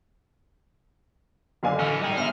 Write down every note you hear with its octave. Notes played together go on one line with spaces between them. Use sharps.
F#1 D3 F5 G#5
E3 C#4 F6
G3 D#4 G#4
G1 E5 F6